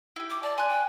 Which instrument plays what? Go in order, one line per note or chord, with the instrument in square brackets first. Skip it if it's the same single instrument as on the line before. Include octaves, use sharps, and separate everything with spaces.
[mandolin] E4 G4
[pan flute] D6
[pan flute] D5 [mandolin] A5
[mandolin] G#5 F#6 [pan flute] C6
[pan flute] G5